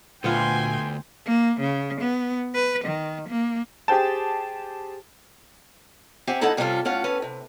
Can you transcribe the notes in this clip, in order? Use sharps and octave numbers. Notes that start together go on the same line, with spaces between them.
D2 A#2 B3 F4 G5 G#5 C6
A#3
C#3
B3
B4
D#3
A#3
G4 G#4 C5 G5 A5
C4 G4 E5 F#5 G#5
G2 D#4 E4 A4 D#5 F#5
C3 G3 C#4 D4 F4 A4
A2 C#4 F4 F#5
C#4 A4 B4
C3